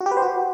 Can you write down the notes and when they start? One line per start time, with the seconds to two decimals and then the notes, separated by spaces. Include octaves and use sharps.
0.01 F#4
0.06 G4
0.11 B4
0.17 C5
0.22 F#4